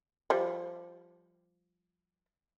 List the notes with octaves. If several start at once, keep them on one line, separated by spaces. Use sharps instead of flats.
F3 G3